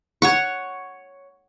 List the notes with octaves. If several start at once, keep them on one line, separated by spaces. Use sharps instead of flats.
C#5 F#5 C#6